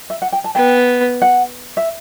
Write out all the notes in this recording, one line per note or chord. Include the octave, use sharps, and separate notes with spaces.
E5
F#5
G5
A5
B3 G5
F#5
E5